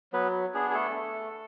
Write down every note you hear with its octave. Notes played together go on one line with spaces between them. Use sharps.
F#3 B3 B4
B3 D4 G#4
G#4
A3 A4
A3